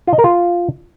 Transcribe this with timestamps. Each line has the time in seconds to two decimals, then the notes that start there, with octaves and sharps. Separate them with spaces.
0.07 F4
0.13 D#5
0.19 A#4
0.24 F4